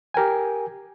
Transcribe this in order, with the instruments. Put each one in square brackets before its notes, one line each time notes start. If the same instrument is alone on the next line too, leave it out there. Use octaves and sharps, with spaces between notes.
[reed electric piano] G4 A#4 G5 G#5